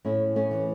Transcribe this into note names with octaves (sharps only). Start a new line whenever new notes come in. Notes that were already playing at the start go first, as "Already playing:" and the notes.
A2 C#4 E4
A3 C#4
E3